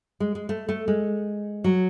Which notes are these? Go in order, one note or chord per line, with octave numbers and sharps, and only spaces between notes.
G#3
G#3
A3
A3
G#3
F#3